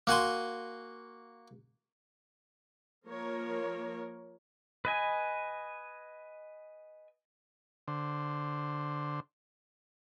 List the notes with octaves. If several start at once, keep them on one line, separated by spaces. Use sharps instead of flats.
A#3 F#4 G#5 C6
F3 A#3 A#4 C#5
B4 D#5 G#5
D3 C5